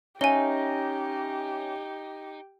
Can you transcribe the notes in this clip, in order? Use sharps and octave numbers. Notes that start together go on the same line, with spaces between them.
C#4 D#4 G4 E5 G#5 G7